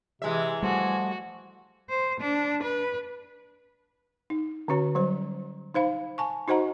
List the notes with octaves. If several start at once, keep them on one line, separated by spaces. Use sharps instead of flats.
C3 E3 G#3 E5
F3 G3 A3 F#4
C5
D4
B4
D#4
D3 C#4 F#4 C#5
F#3 G3 C5
D#4 C5 F5 B5
G#5 A5 C#6
D#4 F#4 C5 D#5 F#5 A#5